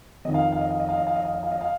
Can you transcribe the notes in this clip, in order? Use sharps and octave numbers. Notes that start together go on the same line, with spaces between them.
F2 D#3 D#5
F5
D#5
F5
D#5
F5
D#5
F5
D#5
F5
D#5
F5
D#5
F5
D#5
F5